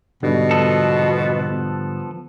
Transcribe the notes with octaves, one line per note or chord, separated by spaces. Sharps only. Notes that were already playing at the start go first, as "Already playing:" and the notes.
G#2 B2 D3 G3
F3 B3 A4